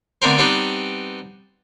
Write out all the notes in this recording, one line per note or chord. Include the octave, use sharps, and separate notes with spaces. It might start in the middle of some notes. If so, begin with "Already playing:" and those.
D3 A3 B3 C4 A#4 C5
G3 B3 C4 D4 D#4 B4